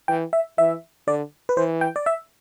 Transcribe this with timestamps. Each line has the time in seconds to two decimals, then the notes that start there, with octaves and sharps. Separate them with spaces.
0.08 E3 G5
0.33 E5
0.58 E3 E5
1.07 D3 D5
1.49 B4
1.57 E3 C5
1.81 G5
1.96 D5
2.06 E5